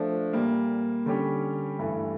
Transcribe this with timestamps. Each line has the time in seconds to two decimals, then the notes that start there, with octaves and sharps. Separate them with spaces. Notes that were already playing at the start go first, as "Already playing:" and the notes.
Already playing: F3 A3 D4
0.33 A#2 G3 A#3
1.06 D3 G3 C#4 G4
1.79 G2 E3 A3